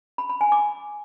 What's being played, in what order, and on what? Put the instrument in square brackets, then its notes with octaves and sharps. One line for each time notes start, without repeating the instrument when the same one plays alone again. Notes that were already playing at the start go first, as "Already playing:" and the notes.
[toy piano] B5
B5
G#5
D6